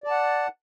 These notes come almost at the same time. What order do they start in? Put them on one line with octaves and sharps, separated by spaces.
D5 A5 F#5